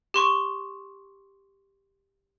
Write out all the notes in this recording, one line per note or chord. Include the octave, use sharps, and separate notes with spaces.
G4 C6 C#6